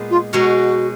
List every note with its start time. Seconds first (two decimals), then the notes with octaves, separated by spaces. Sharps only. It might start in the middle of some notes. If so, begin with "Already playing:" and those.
Already playing: A#2 G#3 B3 D#4
0.10 F4
0.33 B2 G#3 D#4 F#4 A#4 C#5